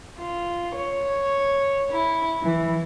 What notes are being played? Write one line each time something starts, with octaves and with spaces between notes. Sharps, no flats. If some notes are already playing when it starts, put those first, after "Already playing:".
F4
C#5
E4
E3